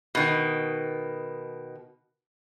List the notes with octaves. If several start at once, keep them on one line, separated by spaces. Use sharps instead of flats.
B2 D#3